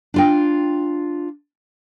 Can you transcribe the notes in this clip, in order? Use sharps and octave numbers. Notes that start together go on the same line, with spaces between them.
D4 F4 G5